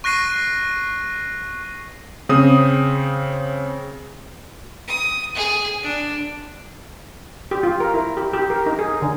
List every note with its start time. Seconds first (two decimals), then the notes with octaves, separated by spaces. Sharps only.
0.04 C#6 F#6 A#6 C7 D#7
2.29 C#3 C4 D#6
4.88 D#6
5.35 G#4
5.83 D4
7.51 G4
7.63 F4
7.80 A#4
7.94 E4
8.17 G4
8.34 G4
8.50 A#4
8.66 D#4
8.79 G#4
9.02 D3